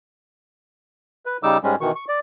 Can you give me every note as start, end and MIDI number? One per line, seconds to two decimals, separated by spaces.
1.26 1.37 71
1.43 1.58 49
1.43 1.58 55
1.43 1.58 63
1.43 1.58 86
1.43 1.58 88
1.64 1.75 44
1.64 1.75 55
1.64 1.75 56
1.64 1.75 61
1.81 1.92 47
1.81 1.92 51
1.81 1.92 52
1.81 1.92 85
1.95 2.05 85
2.09 2.20 74